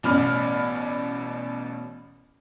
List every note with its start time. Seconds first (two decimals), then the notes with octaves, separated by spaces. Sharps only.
0.03 A1 B2 C#4 D5 B5 F6